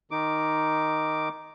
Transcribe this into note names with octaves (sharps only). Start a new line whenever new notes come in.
D#3 D#4 D6